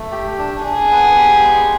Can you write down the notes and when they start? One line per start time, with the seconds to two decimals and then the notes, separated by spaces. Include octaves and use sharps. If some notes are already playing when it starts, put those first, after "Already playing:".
Already playing: A3
0.11 G4
0.39 D4
0.64 D4 G#4
0.90 B3
1.17 G4
1.44 G#3